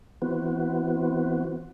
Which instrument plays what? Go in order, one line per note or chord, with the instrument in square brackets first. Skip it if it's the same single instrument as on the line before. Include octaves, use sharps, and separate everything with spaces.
[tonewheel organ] E3 B3 C4 F#4